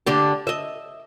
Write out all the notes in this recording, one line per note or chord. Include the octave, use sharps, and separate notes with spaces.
D3 D4 G4
D#5 E5